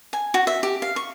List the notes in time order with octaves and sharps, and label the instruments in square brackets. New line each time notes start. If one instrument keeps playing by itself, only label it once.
[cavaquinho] G#5
F#4
E5
G4
F5
C#6